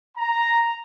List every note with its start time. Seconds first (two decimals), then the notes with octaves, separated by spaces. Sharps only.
0.17 A#5